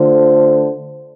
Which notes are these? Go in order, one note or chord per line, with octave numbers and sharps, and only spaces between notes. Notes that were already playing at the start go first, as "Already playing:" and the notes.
Already playing: D3 A3 F4 C5